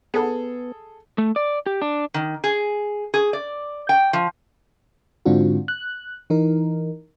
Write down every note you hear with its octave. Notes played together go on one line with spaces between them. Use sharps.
B3 G#4 A4
A3
D5
G4
D4
D#3
G#4
G#4
D5
G5
F3
G#2 D3 C4 D4 F4 F#4
F#6
E3 D#4 A#4